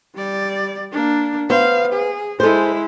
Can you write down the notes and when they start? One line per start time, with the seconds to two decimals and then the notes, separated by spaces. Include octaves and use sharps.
0.15 G3 D5
0.93 A#3 D4
1.50 B3 C5 F5
1.92 G#4
2.40 G#3 E4 A4 C5